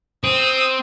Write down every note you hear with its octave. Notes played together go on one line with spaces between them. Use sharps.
C4 D#6 E6